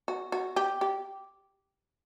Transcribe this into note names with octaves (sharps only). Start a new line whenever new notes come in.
F#4
F#4
G4
G4